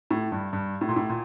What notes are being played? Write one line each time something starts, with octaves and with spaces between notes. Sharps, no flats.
A2
G2
G2
A2
A#2
A2
A#2